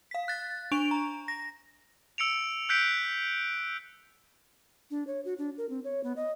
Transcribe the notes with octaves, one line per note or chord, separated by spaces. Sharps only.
F5 B6
F#6 A6
D4 C#6 D7 F7
A#5
A#6
E6 C#7 D7 F7
E6 F#6 G6 B6 C#7 D7
D4
C#5
F#4
D4
A#4
C4
C#5
B3
D#5